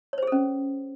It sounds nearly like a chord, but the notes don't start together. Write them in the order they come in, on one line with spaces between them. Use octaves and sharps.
C#5 C5 G#4 A4 C#4